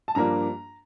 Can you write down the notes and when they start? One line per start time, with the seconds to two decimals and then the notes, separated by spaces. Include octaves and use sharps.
0.08 A5
0.15 G2 F3 A#3 D4 A#5